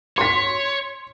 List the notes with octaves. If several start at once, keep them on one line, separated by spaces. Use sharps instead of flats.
C#5 C6 B6